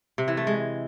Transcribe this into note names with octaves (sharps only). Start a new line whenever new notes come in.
C3
E3
A3
G#3